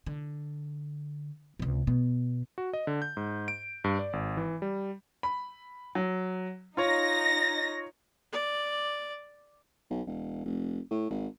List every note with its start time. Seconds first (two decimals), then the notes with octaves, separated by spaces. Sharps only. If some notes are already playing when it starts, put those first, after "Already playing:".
0.06 D3
1.59 C#2 C3
1.87 B2 B3
2.58 F#4
2.73 D#5
2.87 D3
3.02 G6
3.17 G#2
3.48 D7
3.84 G2
3.99 D5
4.13 G#1
4.37 E3
4.62 G3
5.23 B5
5.95 F#3
6.77 D#4 F4 C#5 A#6
8.32 D5
9.90 B1
10.07 E1
10.45 F1
10.90 A2
11.10 G#1